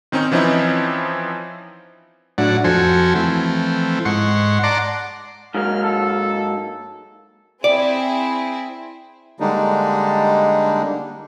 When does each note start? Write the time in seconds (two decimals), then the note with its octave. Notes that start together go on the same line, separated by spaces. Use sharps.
0.12 D#3 C4 C#4 D#4
0.32 E3 F3 C4 C#4 D#4 E4
2.38 A2 F#3 D4 F#5
2.64 F2 F3 F#4 A4 C5 G#5
3.15 E3 F3 A3 C4
4.05 G#2 F#5 C6 C#6
4.63 D5 F#5 A5 A#5 C6 D6
5.55 G#2 F#3 A#3 F6
5.83 A4
7.64 C4 E4 G#4 D5
9.40 D3 G3 G#3 A#3 D4 D#4